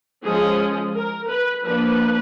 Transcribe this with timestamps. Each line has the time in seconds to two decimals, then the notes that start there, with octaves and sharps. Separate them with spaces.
0.25 F3 G#3 C#4 G#4
0.95 A#4
1.30 B4
1.66 F3 A#3 D4 B4